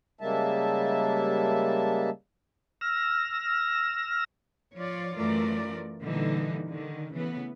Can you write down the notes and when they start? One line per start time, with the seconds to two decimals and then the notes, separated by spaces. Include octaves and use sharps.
0.21 C#3 G3 G#3 A#3 E5 A5
2.81 E6 F6 A#6
4.75 F3 F4 C#5 D5
5.17 F#2 E3 A3 F4 A#4 D5
6.02 A#2 D3 E3 G3 A#3 D#4
6.68 D3 D#3
7.13 C#3 E3 A3 B3